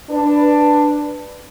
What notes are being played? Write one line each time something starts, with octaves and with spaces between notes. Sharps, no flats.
D4 B4